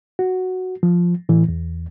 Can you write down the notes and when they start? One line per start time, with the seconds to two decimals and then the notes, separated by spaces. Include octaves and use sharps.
0.19 F#4
0.83 F3
1.29 A2 E3
1.48 E2